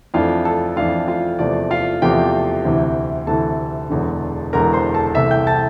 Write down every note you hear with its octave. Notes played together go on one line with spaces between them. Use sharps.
F2 E3 A3 D4 F4 F5
A4 A5
F2 E3 A3 D4 F4 F5
F4 F5
E2 C3 F3 A3 D5
F4 F5
E2 C3 F3 A3 G4 G5
D2 C3 E3
D2 C3 E3 A4 A5
E1 E2 D3
E1 E2 D3 A#4 A#5
C5 C6
A4 A5
C2 C3 E3 A3 E5 E6
G5 G6
A5 A6